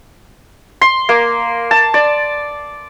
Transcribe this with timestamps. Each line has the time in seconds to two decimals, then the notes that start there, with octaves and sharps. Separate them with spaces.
0.81 C6
1.09 A#3
1.71 A5
1.94 D5